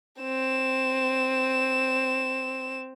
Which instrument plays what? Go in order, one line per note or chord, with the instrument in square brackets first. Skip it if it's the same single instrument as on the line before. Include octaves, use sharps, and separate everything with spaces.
[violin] C4 E7